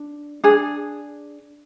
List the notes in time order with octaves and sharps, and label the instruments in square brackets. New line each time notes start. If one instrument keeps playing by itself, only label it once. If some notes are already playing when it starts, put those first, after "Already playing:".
Already playing: [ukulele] D4
D4 G#4